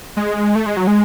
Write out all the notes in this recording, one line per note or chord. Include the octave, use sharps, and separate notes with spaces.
G#3
A3
G#3
F#3
G#3